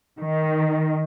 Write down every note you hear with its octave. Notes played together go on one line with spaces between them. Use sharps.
D#3